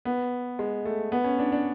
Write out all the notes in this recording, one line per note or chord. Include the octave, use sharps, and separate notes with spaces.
B3
G#3
A3
B3
C#4
D4
D4